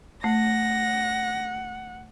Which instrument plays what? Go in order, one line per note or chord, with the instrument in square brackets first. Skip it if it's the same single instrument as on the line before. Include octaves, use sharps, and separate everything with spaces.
[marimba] A3 [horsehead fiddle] F#5 [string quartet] A#6